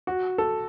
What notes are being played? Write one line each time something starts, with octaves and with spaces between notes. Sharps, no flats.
F#4
A4